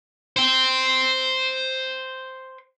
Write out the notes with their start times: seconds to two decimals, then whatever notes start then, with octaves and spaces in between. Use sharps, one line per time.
0.36 C5 G5